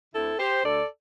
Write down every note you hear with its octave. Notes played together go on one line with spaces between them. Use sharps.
D2 D3 C4 E4 A4
G4 C5
D2 D3 A3 A4 D5